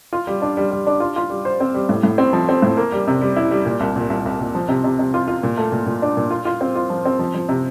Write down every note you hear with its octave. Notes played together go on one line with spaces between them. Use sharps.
F4
G3
D4
G3
G3
D4
F4
F4
G3
C5
C4
G3
A2
A2
C4
F3
C4
A2
A#3
G3
C3
G3
E4
G3
A#2
C2
A#2
C2
C2
A#2
F3
C3
C3
C3
F4
F4
A#2
A3
A#2
A#2
D4
A#2
F4
F4
C4
F4
F3
C4
F3
F3
C3